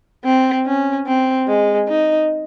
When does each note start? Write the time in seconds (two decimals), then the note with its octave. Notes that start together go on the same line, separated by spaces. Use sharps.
0.24 C4
0.66 C#4
1.07 C4
1.47 G#3
1.88 D#4